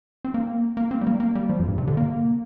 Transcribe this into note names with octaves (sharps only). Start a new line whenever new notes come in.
C4
A#3
A#3
C4
G3
A#3
A#3
G3
F3
F2
G2
C3
D3
A#3